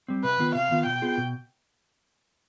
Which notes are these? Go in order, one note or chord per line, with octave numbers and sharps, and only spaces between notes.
G3 C4
C3 B4
D#3 B3 F4
C3 F5
D#3 B3 F4
B2 G5
B3 F4 G#4
B2